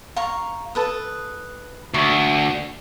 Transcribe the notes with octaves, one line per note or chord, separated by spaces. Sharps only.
F5 A#5 C#6
A4 B4 D#6
D2 C#6